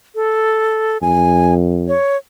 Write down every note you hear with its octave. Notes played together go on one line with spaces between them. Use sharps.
A4
F2 G#5
C#5